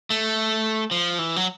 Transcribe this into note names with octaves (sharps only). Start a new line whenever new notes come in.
A3
F3
E3
F#3